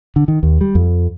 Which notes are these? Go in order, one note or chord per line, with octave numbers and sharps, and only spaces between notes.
D3
D#3
D#2
G3
F2